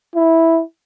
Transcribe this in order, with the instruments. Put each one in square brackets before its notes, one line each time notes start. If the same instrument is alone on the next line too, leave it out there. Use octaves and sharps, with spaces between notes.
[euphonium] E4